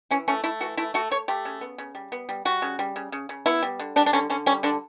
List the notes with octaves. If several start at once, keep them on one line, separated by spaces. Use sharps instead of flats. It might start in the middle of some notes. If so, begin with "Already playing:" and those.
E3 C#4
A3 C#4
A3 E4
E3 F#4
A3 E4
A3 F#4
A3 C#5
A3 G4
C#3
B3
C#3
G3
B3
G3
G3 F#4
C#3
G3
C#3
C#3
C#3
B3 E4
G3
D3
G3 D4
D4
D3 C#4
D3 C#4
G3 C#4
D3 D4